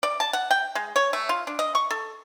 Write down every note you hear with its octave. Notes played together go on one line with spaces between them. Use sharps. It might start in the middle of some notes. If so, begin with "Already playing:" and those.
D5
A5
F#5
G5
G#3
C#5
A3
F4
D4
D#5
C#6
A4